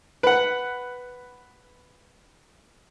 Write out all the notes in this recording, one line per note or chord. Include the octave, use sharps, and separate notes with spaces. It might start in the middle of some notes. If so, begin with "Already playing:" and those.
B4 F#5